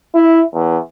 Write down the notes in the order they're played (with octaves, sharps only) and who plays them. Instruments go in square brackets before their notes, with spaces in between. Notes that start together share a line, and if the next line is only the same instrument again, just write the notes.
[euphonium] E4
E2